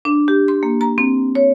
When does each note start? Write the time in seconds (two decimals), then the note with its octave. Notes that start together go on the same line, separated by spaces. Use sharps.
0.05 D4
0.28 G4
0.48 C6
0.63 A#3
0.81 A#5
0.98 C4
1.35 C#5